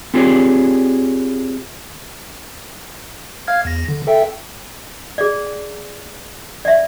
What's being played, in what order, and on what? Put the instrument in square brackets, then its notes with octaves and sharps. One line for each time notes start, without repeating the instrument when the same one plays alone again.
[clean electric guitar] C4 F4 G4 G#4 C#5 D5
[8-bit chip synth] F5 F6 G#6
E2 A#6
D3
A4 E5 G5
[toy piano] G#4 D5
D5 E5